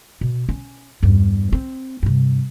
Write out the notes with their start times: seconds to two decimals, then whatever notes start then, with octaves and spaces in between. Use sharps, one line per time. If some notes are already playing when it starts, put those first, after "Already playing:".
0.21 B2
0.49 C#4
1.03 E2 G2
1.52 C4
2.03 G2 C3